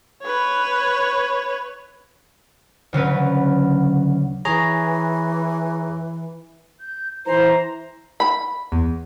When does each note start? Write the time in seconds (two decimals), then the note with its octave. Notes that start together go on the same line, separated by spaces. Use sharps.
0.23 B4 C#5
2.93 D2 C#3 F#3 B4
4.45 E3 G#4 C#5 A#5
6.80 G6
7.26 E3 C5 A#5
8.20 B5
8.72 E2